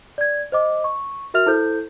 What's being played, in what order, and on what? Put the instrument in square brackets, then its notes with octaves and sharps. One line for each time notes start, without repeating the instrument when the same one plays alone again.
[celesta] D5 G#6
C5 D#5 D6
C#6
F#4 A#4 E5 F6 F7
E4 A4 C5 G6